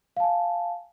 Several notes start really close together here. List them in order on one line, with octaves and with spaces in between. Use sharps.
F5 A5 G#5